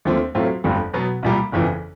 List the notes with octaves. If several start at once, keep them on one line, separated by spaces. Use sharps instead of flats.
D#2 D3 F3 A3 C4
A2 F#3 A3 C4 F4
G1 F2 D3 G3
B2 F#3 B3
C2 A#2 G3
G1 F2 C#3 E3